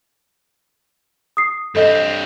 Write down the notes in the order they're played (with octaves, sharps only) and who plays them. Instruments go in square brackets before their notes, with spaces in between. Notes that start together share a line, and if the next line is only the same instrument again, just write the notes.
[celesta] D#6 C7
[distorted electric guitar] G2 C4 [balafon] A4 D#5